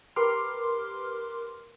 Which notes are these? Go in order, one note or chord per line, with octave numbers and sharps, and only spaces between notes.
G4 A#4 B4 C6 D6 F6